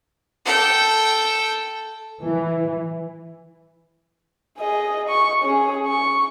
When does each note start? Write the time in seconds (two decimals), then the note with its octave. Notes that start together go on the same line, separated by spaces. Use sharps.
0.45 A4 G5
2.22 E3
4.59 G#4 D#5
5.09 C#6
5.43 C#4 G#4
5.86 C#6